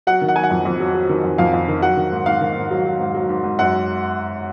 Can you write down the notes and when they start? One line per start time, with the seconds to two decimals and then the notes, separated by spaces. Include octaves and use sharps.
0.07 F#3 F#5
0.21 D#3
0.28 F#5
0.36 F#3 G#5
0.44 F#5
0.51 F2
0.65 F2
0.80 F#3
0.94 F#3
1.09 D#3
1.24 F2
1.38 F2 F5
1.54 F2
1.68 D#3
1.82 F#3 F#5
1.97 D#3
2.11 G#2
2.26 G#2 F5
2.41 D#3
2.56 G#2
2.71 F#3
2.85 F#3
3.00 G#2
3.14 F#3
3.29 G#2
3.44 G#2
3.59 F#2 F#5